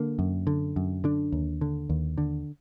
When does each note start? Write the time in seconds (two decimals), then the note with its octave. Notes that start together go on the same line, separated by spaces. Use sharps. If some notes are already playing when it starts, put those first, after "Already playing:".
Already playing: D3 A#3
0.19 F#2
0.47 D3
0.76 F#2
1.04 D3 D4
1.33 D#2
1.61 D3
1.90 D#2
2.18 D3